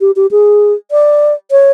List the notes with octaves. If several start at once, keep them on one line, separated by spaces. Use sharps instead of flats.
G4
G4
G#4
D5
C#5